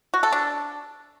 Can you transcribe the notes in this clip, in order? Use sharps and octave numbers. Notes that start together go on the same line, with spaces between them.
F#4
A4
D4